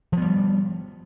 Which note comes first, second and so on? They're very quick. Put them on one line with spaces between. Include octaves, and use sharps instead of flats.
F3 B3 G3